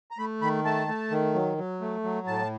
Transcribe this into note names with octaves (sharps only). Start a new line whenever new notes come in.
A#5
A3 B5
D#3 B5
A3 A5
A3
D#3
F#3
F#3
A3
F#3
A2 A5